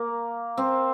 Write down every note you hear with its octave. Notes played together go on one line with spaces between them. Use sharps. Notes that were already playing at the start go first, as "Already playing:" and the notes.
Already playing: A#3
C4